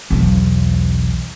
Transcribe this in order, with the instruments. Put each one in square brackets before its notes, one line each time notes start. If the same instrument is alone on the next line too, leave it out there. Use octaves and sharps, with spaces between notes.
[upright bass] B1 E2